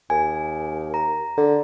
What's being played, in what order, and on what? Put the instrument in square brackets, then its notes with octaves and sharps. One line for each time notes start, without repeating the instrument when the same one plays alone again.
[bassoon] D#2 [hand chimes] G#5
[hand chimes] A#5
[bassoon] D3